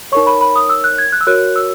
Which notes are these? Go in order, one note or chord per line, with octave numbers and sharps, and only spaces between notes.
D#4 A#4 C#5 C#6
B5
B5
D#6
E6
F#6
G#6
F#6
E6
F#4 A#4 C#5 F#6
E6